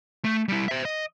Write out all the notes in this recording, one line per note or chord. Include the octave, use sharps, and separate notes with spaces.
A3
G3 E4
C5 E5
D#5